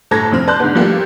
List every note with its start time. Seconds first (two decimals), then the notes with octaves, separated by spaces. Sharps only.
0.11 G1 A2 A4 A#5 G#6 A#6
0.31 F1 F3 C4 F6
0.47 B4 D5 A5 C6 F#6 G6
0.60 G#2 D3 B3
0.75 F3 G3 A3 A#3 F4 G4